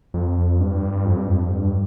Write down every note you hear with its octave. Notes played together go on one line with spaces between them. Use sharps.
F2
G2
F2
G2
F2
G2